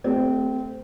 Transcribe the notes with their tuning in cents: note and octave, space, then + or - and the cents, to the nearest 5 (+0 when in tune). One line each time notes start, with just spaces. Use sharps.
A3 +0 C4 -20 G4 +40